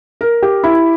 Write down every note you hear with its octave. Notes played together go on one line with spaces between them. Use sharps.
A#4
G4
E4